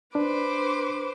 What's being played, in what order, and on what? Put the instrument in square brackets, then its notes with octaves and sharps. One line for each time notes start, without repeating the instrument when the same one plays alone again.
[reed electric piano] D4 [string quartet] B4 C5 D6